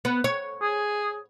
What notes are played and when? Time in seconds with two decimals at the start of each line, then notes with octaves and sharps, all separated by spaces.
0.05 B3
0.24 C#5
0.62 G#4